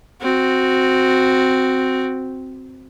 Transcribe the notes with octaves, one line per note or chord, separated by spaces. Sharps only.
C4 F#4